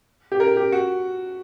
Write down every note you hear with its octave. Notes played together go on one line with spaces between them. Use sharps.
G4
A#4
G4
F#4